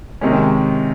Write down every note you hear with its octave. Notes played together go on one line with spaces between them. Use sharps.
C3 D#3 G#3 C#4